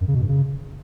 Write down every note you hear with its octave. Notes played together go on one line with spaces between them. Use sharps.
F#2
C#3
B2
G2
C#3